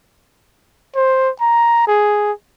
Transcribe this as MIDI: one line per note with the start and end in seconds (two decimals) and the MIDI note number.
0.96 1.30 72
1.41 1.87 82
1.87 2.32 68